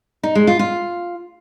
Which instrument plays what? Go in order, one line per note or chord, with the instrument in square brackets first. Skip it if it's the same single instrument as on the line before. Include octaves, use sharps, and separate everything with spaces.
[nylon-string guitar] D#4
G#3
F4
F4